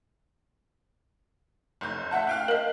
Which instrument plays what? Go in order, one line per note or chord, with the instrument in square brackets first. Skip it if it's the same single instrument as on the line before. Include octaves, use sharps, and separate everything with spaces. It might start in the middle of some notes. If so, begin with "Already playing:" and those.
[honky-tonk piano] F1 G6
E5 F#5 A5
F5 G5 F#6
[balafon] A#4 D#5